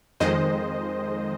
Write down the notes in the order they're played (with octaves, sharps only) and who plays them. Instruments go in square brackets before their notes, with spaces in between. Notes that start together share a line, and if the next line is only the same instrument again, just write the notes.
[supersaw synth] F2 D#3 G#3 C5 D#5